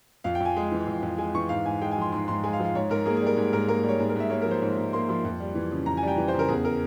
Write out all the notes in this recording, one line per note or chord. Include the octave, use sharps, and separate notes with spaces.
F2 F5
G5
F2 G#5
G#3
E3
F2
F2
G#3 G#5
E3 C#6
G#2 F5
G#2 G#5
G#3 G5
G#5
F3 C6
G#2 C6
G#2 C6
G#3 G#5
F5
F3
F5
G#2 C#5
G#2 A#4
A#3 G#4
G3 G#4
A#4
G#2 G#4
G#2 A#4
A#3 A#4
G3
C#5
G#2 G#4
A#4
G#2 E5
A#3 C#5
F3 A#4
C5
G#2 C#5
G#2
A#3 C6
F3 C6
F2
G3
E3
C#3
F2 A#5
G#5
G3 G5
E3
C5
C#3
A#4
E2 G#4
A#4